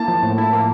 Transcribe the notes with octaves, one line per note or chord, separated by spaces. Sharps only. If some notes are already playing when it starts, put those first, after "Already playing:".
Already playing: A#3 E4 A5
F3
A2
E4
A#3